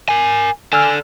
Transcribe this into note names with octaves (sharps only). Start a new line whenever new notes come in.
A#4 G#5
A4 D5 G#5 E6 F6